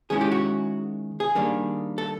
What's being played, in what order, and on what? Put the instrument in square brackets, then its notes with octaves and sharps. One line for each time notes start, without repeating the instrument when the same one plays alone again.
[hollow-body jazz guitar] D#3 G#3 C#4 E4 G#4
G4
F#4
G#4
D#3 G3 A#3 D4
A4